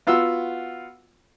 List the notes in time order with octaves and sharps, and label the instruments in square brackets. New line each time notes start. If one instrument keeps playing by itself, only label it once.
[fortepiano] B3 F4 F#4 E6